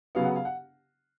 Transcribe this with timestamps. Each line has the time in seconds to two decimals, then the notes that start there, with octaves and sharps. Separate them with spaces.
0.15 C#3 F#3 B3 F5
0.25 F#5
0.35 F5
0.45 F#5